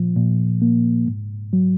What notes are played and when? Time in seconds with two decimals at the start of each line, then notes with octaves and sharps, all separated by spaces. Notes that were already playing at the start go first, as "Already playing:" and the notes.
Already playing: A#2 F3
0.16 A#2
0.62 A#3
1.06 G#2
1.53 F#3